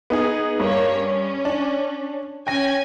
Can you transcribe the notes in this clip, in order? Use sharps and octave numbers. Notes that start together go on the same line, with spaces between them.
B3 D#4 G#4
G2 A#3 C#5
C#4
D4
C#4 G5 G#5 A#6